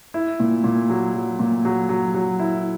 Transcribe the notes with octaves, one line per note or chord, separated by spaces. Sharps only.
E4
A#2
A#2
F#3
F#3
A#2
F#3
F#3
F#3
E4